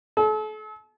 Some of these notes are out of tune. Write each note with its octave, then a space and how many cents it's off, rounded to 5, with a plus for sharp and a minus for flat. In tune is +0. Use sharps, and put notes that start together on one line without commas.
A4 -40